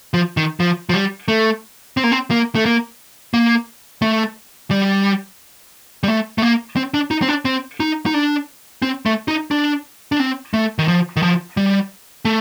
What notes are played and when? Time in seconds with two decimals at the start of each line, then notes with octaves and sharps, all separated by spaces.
0.14 F3
0.37 D#3
0.60 F3
0.89 F3
0.94 G3
1.28 A3
1.97 C4
2.04 A#3
2.12 C4
2.31 A#3
2.55 A3
2.65 A#3
3.34 A#3
4.02 A3
4.71 G3
6.03 G3
6.08 A3
6.38 A3
6.42 A#3
6.76 C4
6.94 D4
7.11 D#4
7.22 C4
7.28 D4
7.45 C4
7.80 D#4
8.06 D#4
8.14 D4
8.82 C4
9.06 A3
9.28 D#4
9.51 D4
10.12 D4
10.20 C4
10.54 A3
10.79 D#3
10.88 F3
11.17 D#3
11.22 F3
11.57 G3
12.25 A3